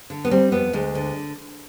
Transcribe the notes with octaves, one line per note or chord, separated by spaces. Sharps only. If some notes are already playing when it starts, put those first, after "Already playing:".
D3
B3
G3 C4
F2 B3
D2 G#3
D3